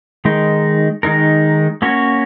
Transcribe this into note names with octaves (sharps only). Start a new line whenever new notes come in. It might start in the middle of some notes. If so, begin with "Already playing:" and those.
D#3 G#3 D#4 A#4
D#3 G#3 D#4 A#4
A#3 C#4 F#4 C#5